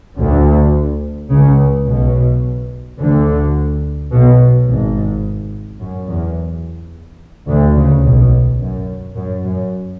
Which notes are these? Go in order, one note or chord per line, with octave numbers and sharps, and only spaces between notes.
D2 D3
C#2 C#3
B1 B2
D2 D3
B1 B2
G#1 G#2
F#2
E2
D2 D3
C#2 C#3
B1 B2
F#2
F#2
F#2